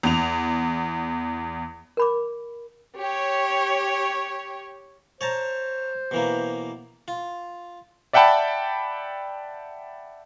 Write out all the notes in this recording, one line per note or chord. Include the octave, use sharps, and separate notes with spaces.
E2 F7
A#4 B5 D6
G4 C#5
C5 C#5 A5 A#5
B2 E3 A#3
F4
D5 E5 F#5 G5 A5 B5